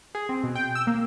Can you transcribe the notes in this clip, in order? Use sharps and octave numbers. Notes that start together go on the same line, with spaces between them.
G#4
C4
B2
G5
E6
A#3